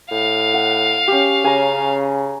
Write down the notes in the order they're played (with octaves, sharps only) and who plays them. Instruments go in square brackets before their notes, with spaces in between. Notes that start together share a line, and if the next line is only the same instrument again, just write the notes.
[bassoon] A2 [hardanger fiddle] F5
[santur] F#5
C#4 G4
[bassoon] C#3 [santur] G#5 A#5